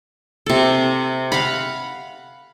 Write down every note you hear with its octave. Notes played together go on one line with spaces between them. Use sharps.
C3 A4
F5 F#5 B5